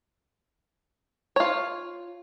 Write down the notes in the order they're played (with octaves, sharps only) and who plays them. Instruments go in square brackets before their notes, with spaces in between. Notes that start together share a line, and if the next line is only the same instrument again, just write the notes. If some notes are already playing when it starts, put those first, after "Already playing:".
[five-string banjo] F4 C#5